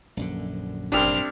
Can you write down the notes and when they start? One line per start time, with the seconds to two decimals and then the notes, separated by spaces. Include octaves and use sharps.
0.17 A#1 F#2 D3
0.92 G1 C2 C4 D4 F6